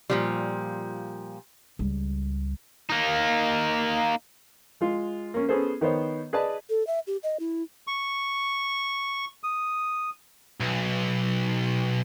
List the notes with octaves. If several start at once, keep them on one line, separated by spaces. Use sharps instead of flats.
A#2 F3 G3
C#2 G3
A#3 D#4
G#3 F4
A#3 C#4
B3 C#4 G#4 A4 C5
D#3 B3 C5 C#5
G#4 B4 D5 D#5 A5
A4
E5
G4
D#5
E4
C#6
D#6
B1